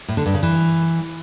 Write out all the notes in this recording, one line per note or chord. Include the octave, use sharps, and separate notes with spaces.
A2
D3
G2
C#3
E3